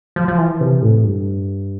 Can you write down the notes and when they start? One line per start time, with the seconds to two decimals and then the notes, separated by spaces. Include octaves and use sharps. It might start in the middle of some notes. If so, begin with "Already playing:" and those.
0.16 F3
0.28 F3
0.38 E3
0.61 C3
0.82 A2
1.04 G2